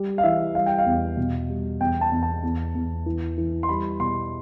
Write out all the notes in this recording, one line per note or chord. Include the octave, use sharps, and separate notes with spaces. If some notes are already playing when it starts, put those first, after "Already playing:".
Already playing: G3
F5
E3 E5
G3 F5
G5
F5
E2
B2
G3
E2 G5
A5
E2
A5
E2
E2
E3
E3
C6
G3 B5
B2 C6